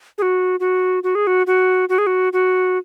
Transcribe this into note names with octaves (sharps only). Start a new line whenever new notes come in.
G#4
F#4
F#4
F#4
G#4
F#4
F#4
F#4
G#4
F#4
F#4